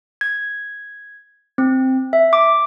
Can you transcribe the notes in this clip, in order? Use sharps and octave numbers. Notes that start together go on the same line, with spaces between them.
G#6
C4
E5
D6